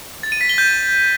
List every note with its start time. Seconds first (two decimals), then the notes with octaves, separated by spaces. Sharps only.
0.23 A6
0.32 D#7
0.41 B6
0.49 G7
0.58 G6